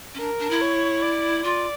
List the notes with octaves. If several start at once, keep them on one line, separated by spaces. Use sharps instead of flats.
C#4
D4 A#4
D4
E4
C#5
D5
F4 D5